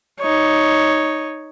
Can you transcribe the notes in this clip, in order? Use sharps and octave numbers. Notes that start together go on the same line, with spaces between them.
D#4 C#5